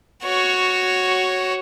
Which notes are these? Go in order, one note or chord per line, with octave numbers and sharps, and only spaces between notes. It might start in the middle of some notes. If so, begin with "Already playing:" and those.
F#4 C#5